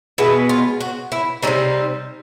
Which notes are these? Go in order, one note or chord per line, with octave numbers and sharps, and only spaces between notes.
B2 G#3 B3 E4
F4
F#4
E4
C3 E3 G3 C4 D#4